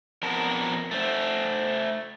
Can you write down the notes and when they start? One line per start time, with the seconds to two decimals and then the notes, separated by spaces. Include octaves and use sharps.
0.23 F2 B3 A#4 A5
0.91 A3 C5